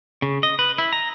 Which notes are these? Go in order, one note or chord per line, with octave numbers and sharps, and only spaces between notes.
C#3
D#5
B4
E4
A#5